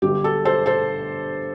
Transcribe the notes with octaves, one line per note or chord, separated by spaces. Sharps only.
G1 G2 D3 G4
A4
A4 C5
A4 C5